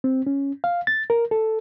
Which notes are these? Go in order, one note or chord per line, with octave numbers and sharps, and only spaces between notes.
C4
C#4
F5
A6
A#4
A4